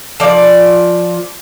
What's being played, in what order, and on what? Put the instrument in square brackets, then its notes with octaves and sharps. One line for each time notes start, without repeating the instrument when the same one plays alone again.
[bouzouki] F3 D5